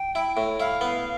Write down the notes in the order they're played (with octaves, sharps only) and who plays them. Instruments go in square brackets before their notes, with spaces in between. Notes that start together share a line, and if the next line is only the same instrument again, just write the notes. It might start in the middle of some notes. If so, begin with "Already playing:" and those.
Already playing: [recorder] G5
[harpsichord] E4
A2
[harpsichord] E4 [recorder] F5
[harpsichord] B3